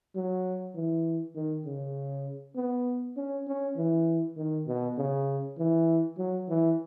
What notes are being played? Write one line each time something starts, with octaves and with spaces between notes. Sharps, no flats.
F#3
E3
D#3
C#3
B3
C#4
C#4
E3
D#3
B2
C#3
E3
F#3
E3